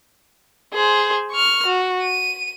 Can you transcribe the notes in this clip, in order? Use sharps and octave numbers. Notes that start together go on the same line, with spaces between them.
G#4 C5
C#6 F6
F#4
D#7